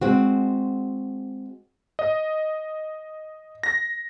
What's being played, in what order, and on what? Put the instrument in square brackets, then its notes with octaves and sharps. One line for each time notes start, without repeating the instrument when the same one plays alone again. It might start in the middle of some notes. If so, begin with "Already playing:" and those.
[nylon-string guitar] G#3 C4 F#4
[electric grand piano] D#5
A#6